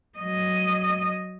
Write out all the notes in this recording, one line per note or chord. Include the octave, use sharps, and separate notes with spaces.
F#3 D#5